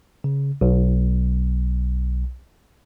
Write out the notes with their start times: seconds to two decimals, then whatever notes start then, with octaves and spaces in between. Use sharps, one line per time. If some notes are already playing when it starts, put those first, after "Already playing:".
0.24 C#3
0.61 B1